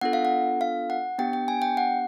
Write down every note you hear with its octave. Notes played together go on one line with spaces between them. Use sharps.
B3 D4 F4 A4 F#5
F5
F#5
F5
F#5
B3 D4 G4 G5
G5
G#5
G5
F#5